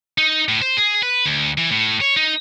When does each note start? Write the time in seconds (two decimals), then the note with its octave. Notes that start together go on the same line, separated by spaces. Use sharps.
0.18 D#4
0.48 A2
0.62 C5
0.77 G#4
1.03 B4
1.26 D2
1.58 E3
1.71 A2
2.01 C#5
2.16 D#4